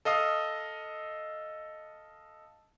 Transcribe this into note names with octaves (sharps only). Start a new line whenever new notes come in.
A4 D#5 F5 D#6